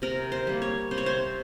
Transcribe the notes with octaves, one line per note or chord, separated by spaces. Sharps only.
C3 A#4
C5
G3 A#3
C#5
C3 C5
C#5
C5